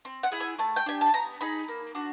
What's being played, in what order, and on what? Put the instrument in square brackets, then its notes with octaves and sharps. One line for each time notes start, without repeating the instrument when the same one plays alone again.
[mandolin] C4
F#5
E4 G#4
G#5
A3 A5
G5
D4 G4 G#5
A5
B3 A#5
D#4 G#4 B5
A#3
D4 F#4